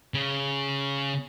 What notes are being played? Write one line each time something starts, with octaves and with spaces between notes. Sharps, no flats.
C#3